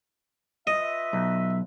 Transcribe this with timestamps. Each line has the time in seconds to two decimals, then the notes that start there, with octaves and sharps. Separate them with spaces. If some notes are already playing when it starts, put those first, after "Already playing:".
0.67 F4 B4 D#5 E5
1.13 B1